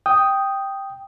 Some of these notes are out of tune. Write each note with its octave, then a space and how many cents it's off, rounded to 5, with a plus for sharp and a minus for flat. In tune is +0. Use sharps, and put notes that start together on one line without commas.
G5 +0 D#6 +0